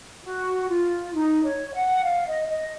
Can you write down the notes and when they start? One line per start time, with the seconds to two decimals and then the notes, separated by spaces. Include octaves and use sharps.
0.23 F#4
0.69 F4
1.13 D#4
1.43 C#5
1.74 F#5
2.04 F5
2.26 D#5
2.49 D#5